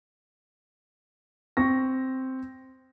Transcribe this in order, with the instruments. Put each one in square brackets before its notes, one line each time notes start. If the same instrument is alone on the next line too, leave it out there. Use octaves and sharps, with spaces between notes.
[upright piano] C4 C#6 A#6